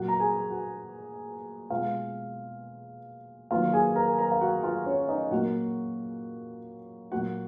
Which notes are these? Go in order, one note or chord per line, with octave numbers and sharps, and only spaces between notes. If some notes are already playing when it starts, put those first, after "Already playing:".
Already playing: A#2 F#3 A#3 F#4 F#5
A#5
G#4 G#5
F#4 F#5
B2 G#3 F4 F5
D#3 F#3 A#3 F4 F5
G#4 G#5
A#4 A#5
A#4 A#5
F5
F#4 F#5
F4 F5
C#4 C#5
D#4 D#5
A#2 F#3 A#3 F#4 F#5
A#2 F#3 A#3 F#4 F#5